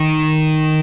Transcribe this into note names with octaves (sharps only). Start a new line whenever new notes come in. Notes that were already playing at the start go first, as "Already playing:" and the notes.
Already playing: D#3